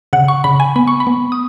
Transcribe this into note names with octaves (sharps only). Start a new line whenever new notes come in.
C#3 F#5
C#6
C#3 B5
G#5
B3 B5
C#6
B5
B3
D#6